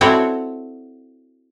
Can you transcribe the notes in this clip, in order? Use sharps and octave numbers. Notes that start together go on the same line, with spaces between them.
C4 E4 F#4 A4 C#5 D5